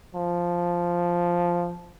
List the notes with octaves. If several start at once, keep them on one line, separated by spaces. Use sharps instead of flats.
F3